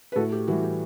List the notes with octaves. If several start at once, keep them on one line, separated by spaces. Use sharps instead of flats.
B4
A2 F#4 A4
G4
E3 G3 F#4
G4